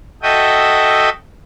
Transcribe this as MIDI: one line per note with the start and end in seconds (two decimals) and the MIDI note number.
0.23 1.09 66
0.23 1.09 69
0.23 1.09 75
0.23 1.09 76
0.23 1.09 79
0.23 1.09 87